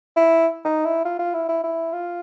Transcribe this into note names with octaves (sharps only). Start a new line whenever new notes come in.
E4
D#4
E4
F4
F4
E4
E4
E4
F4